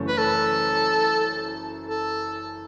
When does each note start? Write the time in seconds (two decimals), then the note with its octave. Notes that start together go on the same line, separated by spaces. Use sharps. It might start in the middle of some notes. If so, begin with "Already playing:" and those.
Already playing: F#1 F#2 E3 A3 C#4
0.08 B4
0.18 A4
1.88 A4